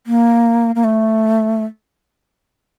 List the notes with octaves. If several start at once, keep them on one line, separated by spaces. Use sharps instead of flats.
A#3
A#3
A3